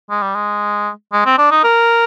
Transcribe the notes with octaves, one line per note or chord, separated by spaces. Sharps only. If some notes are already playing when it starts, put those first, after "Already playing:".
G#3
G3
G#3
G#3
C4
D4
D#4
A#4